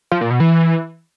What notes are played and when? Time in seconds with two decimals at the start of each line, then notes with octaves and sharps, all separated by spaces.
0.12 F3
0.21 A#2
0.31 B2
0.40 E3